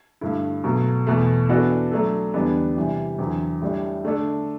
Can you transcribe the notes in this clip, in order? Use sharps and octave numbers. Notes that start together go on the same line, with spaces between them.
G2 D3 A3 E4
B2 F#3 A3
E2 B2 A3
E3 B3 D4 F#4 A4
F#3 A3 D4 A4
E2 D3 G3 B3 D4
C3 E3 G3
E2 D3 F#3 C4
A2 G3 D4
D3 A3 D4 A4